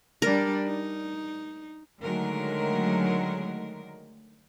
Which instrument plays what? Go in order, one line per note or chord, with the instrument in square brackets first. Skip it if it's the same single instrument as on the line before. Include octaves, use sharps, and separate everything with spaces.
[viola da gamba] G3 D4 [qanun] A#4
[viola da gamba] D#4
[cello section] D3 D#3 F#3 G#3 A3 A#4